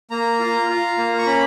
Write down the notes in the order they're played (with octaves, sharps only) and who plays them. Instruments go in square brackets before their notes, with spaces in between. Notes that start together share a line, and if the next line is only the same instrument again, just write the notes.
[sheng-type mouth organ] A#3 A#5
F4
F4
A#3
C#6
C#4 B5